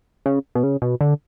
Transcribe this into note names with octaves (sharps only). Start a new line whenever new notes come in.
C#3
B2
C#3
B2
D3